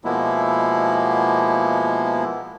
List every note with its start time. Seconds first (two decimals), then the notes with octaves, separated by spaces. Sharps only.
0.05 B2 F3 G#3 A#3 B3 E4